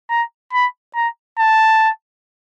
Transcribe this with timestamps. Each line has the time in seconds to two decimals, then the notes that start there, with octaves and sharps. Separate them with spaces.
0.10 A#5
0.53 B5
0.95 A#5
1.39 A5